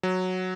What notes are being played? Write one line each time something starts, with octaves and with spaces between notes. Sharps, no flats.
F#3